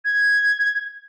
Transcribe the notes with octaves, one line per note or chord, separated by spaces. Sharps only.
G#6